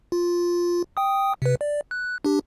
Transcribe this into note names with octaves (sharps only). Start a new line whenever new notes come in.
F4
G5 D#6
C3 B4
D5
F#6
D4 G4